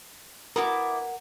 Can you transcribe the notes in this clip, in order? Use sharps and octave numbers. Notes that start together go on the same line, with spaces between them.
B3 E4 F#4 A#4 D6